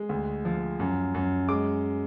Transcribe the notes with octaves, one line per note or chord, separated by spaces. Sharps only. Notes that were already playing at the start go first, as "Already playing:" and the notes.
Already playing: G#3
D2
F3
F#2
F#2
G#3 D6